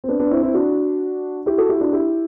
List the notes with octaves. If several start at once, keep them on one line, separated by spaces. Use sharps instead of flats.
C4
B3 D4
B3 D4
C4 E4
C4 E4
D4 F#4
E4 G4
F#4 A4
E4 G4
D4 F#4
E4 G4